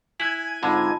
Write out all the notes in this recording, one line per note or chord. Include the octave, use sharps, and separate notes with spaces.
E4 G#5 F#6 F#7
G#2 D3 G#3 C4 D#4 F4 A5 B5